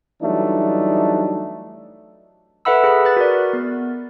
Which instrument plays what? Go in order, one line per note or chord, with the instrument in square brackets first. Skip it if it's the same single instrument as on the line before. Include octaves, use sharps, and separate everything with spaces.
[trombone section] E3 F#3 G3 A3 D4 D#4
[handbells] A4 B4 E5 F#5 B5 E6
G#4 F#5 B5
B4 F#6 A6
F#4 A#4 D5
B3